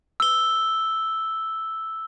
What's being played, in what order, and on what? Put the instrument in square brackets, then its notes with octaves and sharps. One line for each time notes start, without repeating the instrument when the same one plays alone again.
[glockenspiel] E6 G7